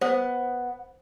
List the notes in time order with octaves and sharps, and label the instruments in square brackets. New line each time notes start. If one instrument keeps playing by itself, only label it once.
[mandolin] B3 [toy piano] C5